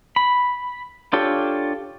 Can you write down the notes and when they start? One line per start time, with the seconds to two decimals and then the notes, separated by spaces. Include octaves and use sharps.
0.16 B5
1.13 D4 F4 G4 A4 C#5